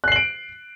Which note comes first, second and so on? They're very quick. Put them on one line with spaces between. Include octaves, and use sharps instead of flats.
F#6 C7 F#7 D7